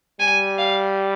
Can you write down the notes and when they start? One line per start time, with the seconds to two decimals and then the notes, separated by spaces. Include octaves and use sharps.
0.20 G3 G#5
0.58 F5